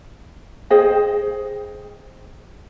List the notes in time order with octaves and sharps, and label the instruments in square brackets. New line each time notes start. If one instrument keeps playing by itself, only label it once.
[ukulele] G#4 C5 D#5 G5